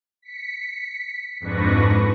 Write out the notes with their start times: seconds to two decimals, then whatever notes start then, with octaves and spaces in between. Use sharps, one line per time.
0.22 B6 C#7
1.40 F2 G#2 D4 B4 C#6 A#6